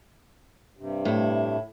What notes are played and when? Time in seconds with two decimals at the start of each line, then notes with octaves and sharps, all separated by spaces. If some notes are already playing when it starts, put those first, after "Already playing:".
0.77 G2 C3
1.05 A2 E4